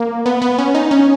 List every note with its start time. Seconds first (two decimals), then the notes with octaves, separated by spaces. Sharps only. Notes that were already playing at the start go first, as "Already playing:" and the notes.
Already playing: A#3
0.26 B3
0.42 B3
0.58 C#4
0.75 D#4
0.91 C#4